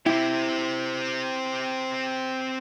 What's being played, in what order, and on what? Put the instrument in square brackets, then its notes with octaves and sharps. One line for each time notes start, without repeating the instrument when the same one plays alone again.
[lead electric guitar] C4 G4 [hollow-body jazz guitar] E4